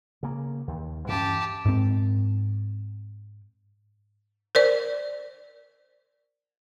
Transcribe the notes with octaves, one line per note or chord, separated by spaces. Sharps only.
C#3 A#3
D#2
G2 E3 C#4 G4 A5
G#2 C4
A#4 C5 D5